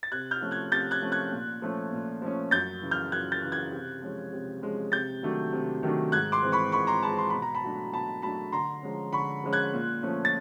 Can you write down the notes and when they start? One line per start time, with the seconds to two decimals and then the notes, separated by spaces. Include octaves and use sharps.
0.03 A6
0.12 C3 F#6 G#6
0.31 F6 G6
0.42 F3 A3 C#4
0.51 F#6 G#6
0.72 C3 G6 A6
0.91 F#6 G#6
1.02 F3 A3 C#4
1.12 F#6 G#6
1.32 A#2
1.62 F3 A3 C#4
1.92 A#2
2.22 F3 A3 C#4
2.51 F#2 G6 A6
2.82 C#3 E3
2.91 F6 G6
3.12 F#2 F#6 G#6
3.32 G6 A6
3.42 C#3 E3
3.52 F#6 G#6
3.72 C3
4.02 F3 G#3 C#4
4.33 C3
4.63 F3 G#3 C#4
4.92 C3 G6 A6
5.23 D#3 F#3 A3 D4
5.52 C3
5.83 D#3 F#3 A3 D4
6.12 G#2 F#6 G#6
6.32 C6 D6
6.43 E3 G#3 C4
6.52 B5 C#6
6.72 G#2 B5 C#6
6.87 A#5 C6
7.02 E3 G#3 C4 A5 B5
7.18 C6
7.30 B2 B5
7.42 A#5
7.55 A5 B5
7.63 F#3 A3 D4
7.93 B2 A5 B5
8.22 F#3 A3 D4 A5 B5
8.52 D3 A#5 C6
8.83 F3 G#3 C#4
9.13 D3 B5 C#6
9.44 F3 G#3 C#4
9.53 F#6 G#6
9.73 A#2
10.03 F3 A3 C#4
10.25 A6